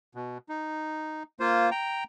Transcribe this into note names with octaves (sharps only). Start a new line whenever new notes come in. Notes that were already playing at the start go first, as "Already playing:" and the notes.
B2
D#4
A#3 F4 C5
G5 A#5